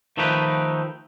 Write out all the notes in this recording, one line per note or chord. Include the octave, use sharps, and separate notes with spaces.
D#3 F3 A3 D#4 G4 B4